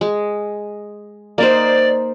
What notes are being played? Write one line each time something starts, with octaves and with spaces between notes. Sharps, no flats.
G#3
A#3 D#4 C5 D5